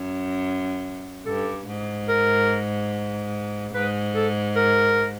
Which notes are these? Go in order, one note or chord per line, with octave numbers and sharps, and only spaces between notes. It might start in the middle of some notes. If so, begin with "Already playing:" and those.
Already playing: F#2
G2 A4
G#2
A#4
G#2 B4
A4
A#4